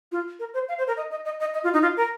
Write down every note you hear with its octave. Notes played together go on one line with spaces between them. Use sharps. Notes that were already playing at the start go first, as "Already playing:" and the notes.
F4
A#4
C5
F5
C5
A#4
D#5
D#5
D#5
D#5
D#5
F4
D#4
F4
A#4